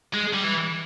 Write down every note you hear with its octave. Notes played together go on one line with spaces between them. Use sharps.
G#3
G3
E3